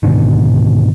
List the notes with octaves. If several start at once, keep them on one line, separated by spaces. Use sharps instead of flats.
G#2 B2 D3 D#3